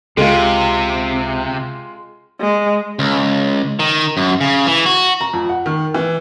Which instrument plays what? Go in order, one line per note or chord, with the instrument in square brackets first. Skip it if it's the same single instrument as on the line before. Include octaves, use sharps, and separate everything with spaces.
[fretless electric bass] C#2 [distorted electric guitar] C3 [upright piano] G#3 F4
[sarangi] G#3
[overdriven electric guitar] C#2
D#3
F#2
C#3
E3
F#4
[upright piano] A#5
F2
F#5
D#3
E3